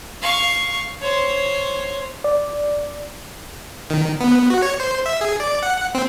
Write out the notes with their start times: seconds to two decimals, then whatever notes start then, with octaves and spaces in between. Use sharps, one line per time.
0.22 F5 C#6
1.02 C5 C#5
2.24 D5
3.90 D#3
4.20 B3
4.50 F#4
4.62 C#5
4.80 C5
5.06 E5
5.21 G#4
5.40 D5
5.63 F#5
5.95 C4